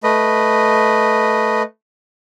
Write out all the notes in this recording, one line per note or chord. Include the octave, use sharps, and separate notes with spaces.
A3 B4 D#5